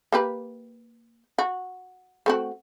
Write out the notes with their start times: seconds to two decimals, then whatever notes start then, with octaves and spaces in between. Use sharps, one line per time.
0.12 A#3 G4 B4
1.39 F#4
2.26 A3 C4 F#4